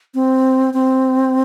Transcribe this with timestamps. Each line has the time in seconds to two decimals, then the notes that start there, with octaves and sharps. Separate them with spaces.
0.15 C4
0.74 C4